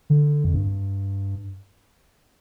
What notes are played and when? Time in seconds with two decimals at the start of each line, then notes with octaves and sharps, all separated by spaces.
0.10 D3
0.44 F2
0.54 G2